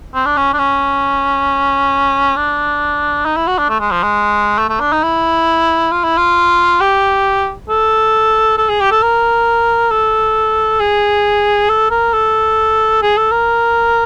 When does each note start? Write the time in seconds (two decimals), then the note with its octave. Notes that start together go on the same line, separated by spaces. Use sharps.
0.14 C4
0.26 D4
0.37 C#4
0.53 D4
0.59 C#4
2.36 D4
3.25 D#4
3.36 E4
3.47 F#4
3.58 D4
3.70 A3
3.80 G#3
3.91 F3
4.03 G#3
4.58 A3
4.69 A3
4.80 D4
4.92 D#4
5.03 E4
5.92 F4
6.04 E4
6.17 F4
6.81 G4
7.69 A4
8.57 A4
8.69 G#4
8.80 G4
8.91 A4
9.03 A#4
9.91 A4
10.80 G#4
11.69 A4
11.91 A#4
12.13 A4
13.02 G#4
13.17 A4
13.31 A#4